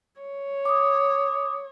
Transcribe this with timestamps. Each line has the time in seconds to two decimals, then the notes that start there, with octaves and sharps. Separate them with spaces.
0.21 C#5
0.65 D6 D#6